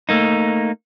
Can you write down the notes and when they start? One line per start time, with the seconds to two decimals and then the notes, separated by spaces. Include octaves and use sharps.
0.09 A3 A#3 D#4